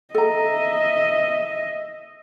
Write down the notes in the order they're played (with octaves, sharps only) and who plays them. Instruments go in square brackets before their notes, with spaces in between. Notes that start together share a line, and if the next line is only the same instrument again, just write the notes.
[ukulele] A4 A#5 [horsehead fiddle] D#5 E5